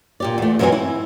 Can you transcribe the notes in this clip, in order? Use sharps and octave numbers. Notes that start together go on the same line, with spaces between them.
A#2 G4 D5
E2 A3
F#2 E3 F#3 G#3 C4 G#5
E4